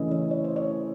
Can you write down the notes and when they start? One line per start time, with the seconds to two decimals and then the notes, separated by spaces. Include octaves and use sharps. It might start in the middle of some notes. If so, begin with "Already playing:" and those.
Already playing: C#3 E3 A3 C#4 E4 B4 D#5
0.11 C#5
0.31 C#5
0.44 C5
0.56 C#5